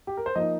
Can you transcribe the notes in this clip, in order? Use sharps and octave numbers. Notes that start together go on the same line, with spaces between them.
G4
A#4
C5
F3 A#3 D#4 D#5